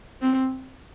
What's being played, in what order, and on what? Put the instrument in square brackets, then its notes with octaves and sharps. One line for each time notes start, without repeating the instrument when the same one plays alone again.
[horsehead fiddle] C4